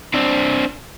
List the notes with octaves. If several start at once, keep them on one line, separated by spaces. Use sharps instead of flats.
C4 D4